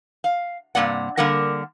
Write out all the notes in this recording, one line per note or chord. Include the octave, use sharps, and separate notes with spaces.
F5
G2 C3 A#3 D5 F#5
D3 G3 A#3 A#4 F#5